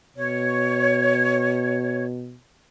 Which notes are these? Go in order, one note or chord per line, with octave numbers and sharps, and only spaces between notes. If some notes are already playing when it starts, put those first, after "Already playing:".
B2 C#5